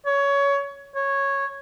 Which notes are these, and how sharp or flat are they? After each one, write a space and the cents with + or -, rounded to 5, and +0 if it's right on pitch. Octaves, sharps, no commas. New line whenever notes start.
C#5 +20
C#5 -5